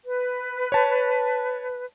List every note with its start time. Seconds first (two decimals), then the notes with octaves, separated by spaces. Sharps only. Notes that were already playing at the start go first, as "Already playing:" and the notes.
0.06 B4
0.72 C#5 A5